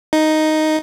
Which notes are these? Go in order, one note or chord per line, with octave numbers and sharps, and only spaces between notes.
D#4